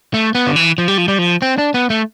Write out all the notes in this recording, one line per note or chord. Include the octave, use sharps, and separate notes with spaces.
A3
B3
D3
E3
F3
G3
F3
G3
F3
C4
D4
B3
A3